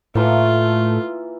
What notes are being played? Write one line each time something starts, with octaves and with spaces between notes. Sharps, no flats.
A2 E3 A3 A#3 F4